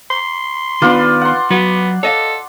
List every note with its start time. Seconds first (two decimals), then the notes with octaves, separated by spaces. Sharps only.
0.11 C6
0.82 D#3 B3 D4 F4 B4 D5
1.21 F#5 C6
1.50 F#3 B3 F#4
2.03 A4 C#5 D#5 F5